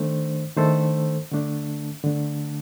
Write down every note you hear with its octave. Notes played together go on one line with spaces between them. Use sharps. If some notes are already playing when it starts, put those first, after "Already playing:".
Already playing: D#3 A3 D4 A4 C5
D#3 A3 D4 A4 C5
D3 A3 D4
D3 A3 D4